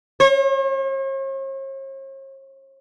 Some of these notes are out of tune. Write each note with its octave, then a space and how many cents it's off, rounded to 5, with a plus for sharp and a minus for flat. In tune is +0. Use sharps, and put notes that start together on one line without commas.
C#5 -45